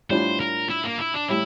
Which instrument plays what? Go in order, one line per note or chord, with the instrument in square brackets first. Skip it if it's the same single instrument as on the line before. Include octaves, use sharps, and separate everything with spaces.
[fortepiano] A2 G3 D4 F4 [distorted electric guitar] C5
[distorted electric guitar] A#4
E4
A#3
E4
D4
[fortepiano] A2 G3 [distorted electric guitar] E4